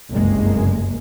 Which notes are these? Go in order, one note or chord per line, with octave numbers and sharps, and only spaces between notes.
F#1 C2 G2 G#3 A#3